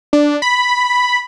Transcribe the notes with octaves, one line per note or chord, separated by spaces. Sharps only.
D4
B5